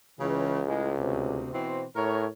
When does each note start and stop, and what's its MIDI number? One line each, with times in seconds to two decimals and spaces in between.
0.20 1.41 37
0.20 0.60 49
0.20 0.60 52
0.67 0.93 45
0.67 0.93 56
0.99 1.52 38
0.99 1.52 48
1.53 1.84 47
1.53 1.84 52
1.53 1.84 60
1.96 2.27 45
1.96 2.26 70
1.96 2.26 73